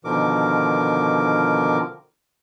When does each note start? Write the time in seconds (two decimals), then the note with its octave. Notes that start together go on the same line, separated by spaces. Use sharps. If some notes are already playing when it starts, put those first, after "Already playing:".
0.05 B2 D3 D#3 F3 A#4 D6